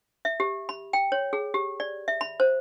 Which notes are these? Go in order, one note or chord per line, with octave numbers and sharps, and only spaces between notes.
E5
G4
B5
G5
C#5
G#4
G4
D5
E5
B5
C5